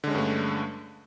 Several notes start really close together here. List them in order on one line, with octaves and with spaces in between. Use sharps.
D3 G#3 C#4 G2 A3